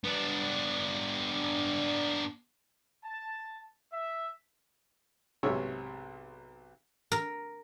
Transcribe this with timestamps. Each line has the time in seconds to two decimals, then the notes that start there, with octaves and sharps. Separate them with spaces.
0.04 B3 D4
3.05 A5
3.93 E5
5.43 B1 G#2 C3 G#4 C#5 E5
7.12 A#4